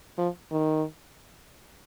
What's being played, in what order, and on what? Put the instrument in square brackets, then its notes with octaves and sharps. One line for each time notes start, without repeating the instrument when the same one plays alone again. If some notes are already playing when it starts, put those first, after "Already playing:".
[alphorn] F3
D#3